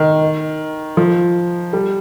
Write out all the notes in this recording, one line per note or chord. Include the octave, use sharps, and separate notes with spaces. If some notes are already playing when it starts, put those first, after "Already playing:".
Already playing: D#3
F3
G3